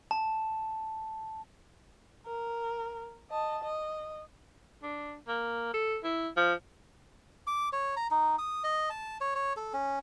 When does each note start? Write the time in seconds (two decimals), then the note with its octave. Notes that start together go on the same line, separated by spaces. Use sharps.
0.11 A5
2.26 A#4
3.30 D#5 A5
3.63 D#5
4.83 D4
5.28 A#3
5.74 A4
6.04 E4
6.37 F3
7.47 D6
7.73 C#5
7.96 A#5
8.11 D#4
8.38 D#6
8.64 D#5
8.90 A5
9.21 C#5
9.35 C#5
9.57 A4
9.73 C#4